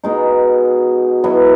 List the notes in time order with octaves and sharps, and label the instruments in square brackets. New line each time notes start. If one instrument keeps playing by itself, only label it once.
[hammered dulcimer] B2 G#3 D#4
B2 F#3 B3 E4